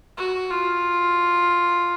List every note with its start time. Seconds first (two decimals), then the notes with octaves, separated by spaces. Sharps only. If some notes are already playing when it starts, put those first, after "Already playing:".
0.17 F#4
0.50 F4